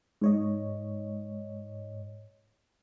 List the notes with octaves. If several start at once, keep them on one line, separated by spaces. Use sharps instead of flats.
G#2 C#5 D#5